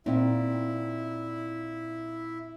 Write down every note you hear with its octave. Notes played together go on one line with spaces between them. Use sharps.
A#2 C4 D#4 E4